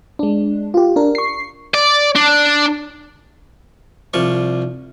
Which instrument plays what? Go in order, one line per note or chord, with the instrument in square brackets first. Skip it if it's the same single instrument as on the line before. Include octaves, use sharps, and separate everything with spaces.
[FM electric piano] G#3 D4
F4 G4
D4 A#4
C#6 C7
[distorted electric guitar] D5
D4
[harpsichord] C2 F3 D5 C#6